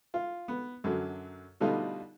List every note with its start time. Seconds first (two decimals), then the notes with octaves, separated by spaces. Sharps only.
0.14 F4
0.48 B3
0.84 F#2 D3 F#3
1.60 B2 D3 G3 A3 D#4 F4